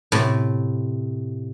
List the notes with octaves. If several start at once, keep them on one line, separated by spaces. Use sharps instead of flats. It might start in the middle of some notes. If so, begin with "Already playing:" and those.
A2 C3